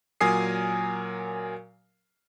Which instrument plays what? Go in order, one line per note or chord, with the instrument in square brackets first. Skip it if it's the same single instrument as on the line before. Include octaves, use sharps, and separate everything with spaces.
[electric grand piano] A#2 F#3 A#4 G#5 D#6 C7